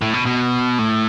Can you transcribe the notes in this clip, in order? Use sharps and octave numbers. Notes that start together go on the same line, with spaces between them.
A2
B2
B2
A2